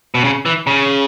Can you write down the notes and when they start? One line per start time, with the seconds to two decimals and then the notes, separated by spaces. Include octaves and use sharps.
0.15 B2
0.24 C#3
0.46 E3
0.67 C#3